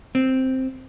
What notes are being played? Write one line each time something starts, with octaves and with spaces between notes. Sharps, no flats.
C4